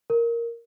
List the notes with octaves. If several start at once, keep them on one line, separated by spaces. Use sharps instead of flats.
A#4